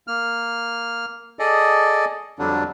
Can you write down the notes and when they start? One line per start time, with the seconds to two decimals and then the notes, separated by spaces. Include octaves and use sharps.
0.07 A#3 F6
1.39 G#4 A4 D5 D#5
2.39 F2 D3 F#3 G3 D4